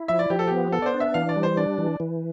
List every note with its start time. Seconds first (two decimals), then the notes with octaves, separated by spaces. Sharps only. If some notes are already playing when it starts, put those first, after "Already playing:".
Already playing: E4
0.08 F3 E5
0.19 D5
0.30 F3 G4
0.39 A4
0.47 B3 G4
0.72 B3 A4
0.82 D5
0.86 C5
0.94 D4
1.00 E5
1.14 E3 F5
1.29 D5
1.36 G3
1.43 C5
1.57 D4 D5
1.78 E3
2.00 E3